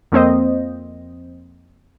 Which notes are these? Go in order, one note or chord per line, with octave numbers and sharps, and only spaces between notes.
F2 A#3 C4 C5 D#5